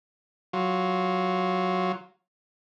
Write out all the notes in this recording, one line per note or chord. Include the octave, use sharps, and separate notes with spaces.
F#3 F4